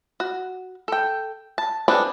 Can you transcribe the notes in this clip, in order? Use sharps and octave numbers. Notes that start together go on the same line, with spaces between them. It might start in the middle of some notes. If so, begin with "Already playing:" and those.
F#4
A4 G5
A5
C4 D4 G#4 A4 B4